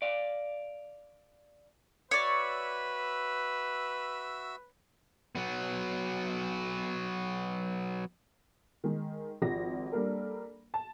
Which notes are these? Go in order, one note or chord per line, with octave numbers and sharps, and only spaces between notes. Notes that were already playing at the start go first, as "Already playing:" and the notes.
D5 F5
F#4 B4 C#5 D5 E5 E6
F#3 B3
D#3 G#3
G#1 F3 G4 A#6
G3 A#3 D4 A4 A#4
A5